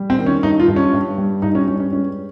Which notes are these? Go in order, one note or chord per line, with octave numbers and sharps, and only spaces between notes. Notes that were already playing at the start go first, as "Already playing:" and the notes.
Already playing: G3
C4
D#3
C#4
G2 D#4
F4
G2
C#4
G2
G3
G2 D#4
C#4
G3 C#4
C#4
G#3 C#4